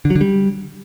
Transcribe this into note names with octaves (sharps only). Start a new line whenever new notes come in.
D3
F#3
D3
G3